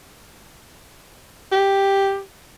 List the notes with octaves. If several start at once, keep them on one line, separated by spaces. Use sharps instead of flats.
G4